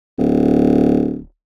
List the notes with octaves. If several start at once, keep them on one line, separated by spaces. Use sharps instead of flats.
D1